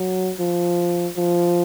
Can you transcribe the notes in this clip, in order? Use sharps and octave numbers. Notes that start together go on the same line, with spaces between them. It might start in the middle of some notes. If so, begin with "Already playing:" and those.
Already playing: F#3
F3
F3